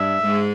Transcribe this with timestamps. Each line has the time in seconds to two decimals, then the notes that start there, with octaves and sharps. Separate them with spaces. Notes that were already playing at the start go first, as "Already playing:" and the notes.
Already playing: G2 E5
0.23 G#2 G#3